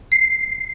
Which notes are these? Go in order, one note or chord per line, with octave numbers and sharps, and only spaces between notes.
C7